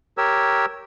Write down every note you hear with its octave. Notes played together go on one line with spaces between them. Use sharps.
G4 A#4 C#5 E6